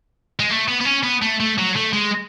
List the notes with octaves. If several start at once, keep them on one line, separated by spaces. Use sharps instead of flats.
G#3
A3
B3
B3
C#4
B3
A3
A3
F#3
A3
G#3